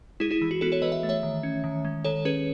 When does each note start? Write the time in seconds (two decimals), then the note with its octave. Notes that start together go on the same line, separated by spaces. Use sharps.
0.20 G#3 E4 G#4
0.31 E4 G#4
0.42 E3
0.51 F#4
0.61 B3 F#4 A4
0.72 A4 C#5
0.82 E3 B4 D#5
0.92 E5
1.03 A3
1.09 C#5 E5
1.23 D#3
1.43 C#4
1.64 D#3
1.85 G#3
2.04 D#3 A4 C#5
2.25 C#4 G#4 B4